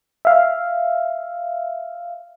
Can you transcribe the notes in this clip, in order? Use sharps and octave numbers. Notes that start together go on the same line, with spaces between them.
E5 F5